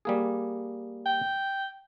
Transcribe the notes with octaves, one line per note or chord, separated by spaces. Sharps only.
G3 A#3 G#4
G5